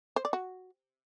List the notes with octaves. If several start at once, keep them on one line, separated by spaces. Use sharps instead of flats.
C5
D5
F#4